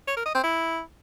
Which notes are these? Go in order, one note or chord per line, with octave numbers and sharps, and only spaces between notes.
C#5
A#4
D#5
C4
E4